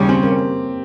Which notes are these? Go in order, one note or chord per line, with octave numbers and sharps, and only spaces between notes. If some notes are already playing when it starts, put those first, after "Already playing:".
Already playing: D#2 C#3 G3 C#4 G4
C4
A#3